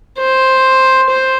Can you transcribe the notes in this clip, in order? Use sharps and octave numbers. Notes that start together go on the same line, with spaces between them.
C5
C5